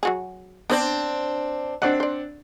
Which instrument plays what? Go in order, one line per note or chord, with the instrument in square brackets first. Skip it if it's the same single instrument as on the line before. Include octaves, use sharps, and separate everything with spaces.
[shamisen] F#3 F#4 G#4
[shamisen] B3 C5 D5 [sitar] C4 D4
[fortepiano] C4 D4 F#5 [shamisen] D#5
[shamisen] C5 D5